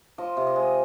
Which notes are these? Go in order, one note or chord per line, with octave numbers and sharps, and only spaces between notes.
F3 D#5
C3
D#5
G#3